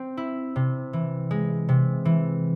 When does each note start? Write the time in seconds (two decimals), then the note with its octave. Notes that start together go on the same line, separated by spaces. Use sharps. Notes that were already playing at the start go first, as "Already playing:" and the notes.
Already playing: C4
0.17 E4
0.56 C3
0.93 E3
1.31 G#3
1.69 C3
2.05 E3